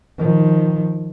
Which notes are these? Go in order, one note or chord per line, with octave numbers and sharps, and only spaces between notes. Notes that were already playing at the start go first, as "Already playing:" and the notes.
D#3 F3